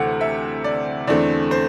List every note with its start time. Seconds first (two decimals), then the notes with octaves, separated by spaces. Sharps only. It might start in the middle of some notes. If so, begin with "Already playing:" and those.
Already playing: D2 C3 E3 A3 F#5
0.21 E5
0.64 D5
1.07 E2 D3 A3 C4 D5
1.51 C5